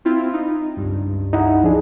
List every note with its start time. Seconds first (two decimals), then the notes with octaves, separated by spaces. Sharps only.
0.05 C4 E4 F4
0.33 D#4
0.77 C#2 G2
1.33 D#4 E4 F#5
1.64 F3 D4 G#4